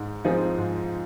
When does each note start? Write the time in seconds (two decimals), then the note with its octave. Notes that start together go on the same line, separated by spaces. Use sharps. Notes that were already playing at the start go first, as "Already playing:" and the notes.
Already playing: G#2
0.24 F3 C4 D#4 G#4
0.58 G#2